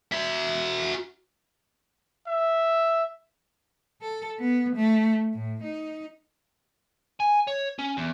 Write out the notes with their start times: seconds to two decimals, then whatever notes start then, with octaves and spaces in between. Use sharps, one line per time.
0.12 F#4 E5
2.27 E5
4.02 A4
4.40 B3
4.76 A3
5.34 A2
5.63 D#4
7.20 G#5
7.47 C#5
7.79 C#4
7.97 E2